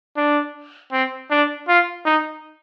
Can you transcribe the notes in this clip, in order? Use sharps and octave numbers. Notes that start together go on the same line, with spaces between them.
D4
C4
D4
F4
D#4